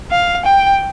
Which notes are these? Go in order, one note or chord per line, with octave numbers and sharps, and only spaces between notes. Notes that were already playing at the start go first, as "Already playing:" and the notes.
F5
G5